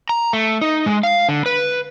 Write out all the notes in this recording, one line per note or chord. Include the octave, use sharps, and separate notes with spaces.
A#5
A3
D#4
G#3
F5
D3
B4